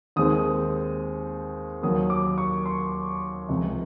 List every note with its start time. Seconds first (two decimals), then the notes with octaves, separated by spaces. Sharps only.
0.16 D#2 D#3 G#3 C4 D#6
1.82 D#2 D#3 F#3 A#3 D#6
2.10 D6
2.38 C#6
2.66 C6
3.49 C#2 C3 F3